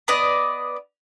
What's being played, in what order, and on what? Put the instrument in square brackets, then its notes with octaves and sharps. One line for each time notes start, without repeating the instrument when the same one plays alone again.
[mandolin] B3 D5 D#5